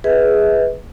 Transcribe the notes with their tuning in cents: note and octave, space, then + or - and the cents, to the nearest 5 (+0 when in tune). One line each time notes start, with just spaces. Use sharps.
G#4 +0 B4 +0 E5 -45